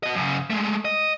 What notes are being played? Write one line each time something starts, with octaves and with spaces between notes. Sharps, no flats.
F#4 D#5
F#2 C#3
G#3 A3
D#5